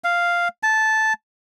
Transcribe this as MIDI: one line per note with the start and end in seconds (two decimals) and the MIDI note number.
0.04 0.48 77
0.63 1.13 81